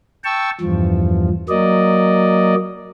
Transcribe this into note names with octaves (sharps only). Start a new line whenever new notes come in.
G5 A5 C#6 E6
E2 G2 F3
F#3 A#3 D5 D#5